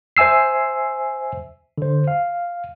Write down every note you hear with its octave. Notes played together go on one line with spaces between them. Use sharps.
C5 E5 G#5 E6 C7
D3 C5
F5